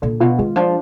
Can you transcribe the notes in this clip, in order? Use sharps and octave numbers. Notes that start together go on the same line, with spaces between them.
A#2 D3
B2 F4
D#3 G#3
F3 D4